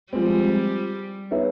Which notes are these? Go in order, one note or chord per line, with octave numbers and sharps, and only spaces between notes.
F3 G3 G#3 C4
B3 D#4 G#4 C#5 E5